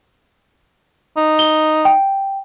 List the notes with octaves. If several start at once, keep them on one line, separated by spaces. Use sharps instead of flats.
D#4
G7
G5